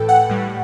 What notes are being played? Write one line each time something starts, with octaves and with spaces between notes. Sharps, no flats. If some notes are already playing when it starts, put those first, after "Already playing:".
Already playing: A2 E3 A4 B4 G5
F#5
A2 G3